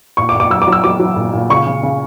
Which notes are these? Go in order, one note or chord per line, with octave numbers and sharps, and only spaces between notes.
A#2 C#6
D6
A#2
D6
F#3 E6
D6
F#3
E6
F#3 D6
F#3
A#2
A#2
C#3 C#6
C#3
C#3